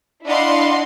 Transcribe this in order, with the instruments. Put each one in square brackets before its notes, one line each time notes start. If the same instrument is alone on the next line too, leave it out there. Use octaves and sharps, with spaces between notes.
[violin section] D4 E4 D#5 F5 F#5 C6